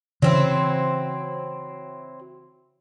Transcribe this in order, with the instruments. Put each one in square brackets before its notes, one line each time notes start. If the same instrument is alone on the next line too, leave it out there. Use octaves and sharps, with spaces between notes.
[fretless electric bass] C#3 E3 [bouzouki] F#3 C4 E4